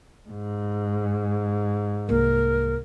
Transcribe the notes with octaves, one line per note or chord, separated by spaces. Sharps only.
G#2
C2 A#3 A#4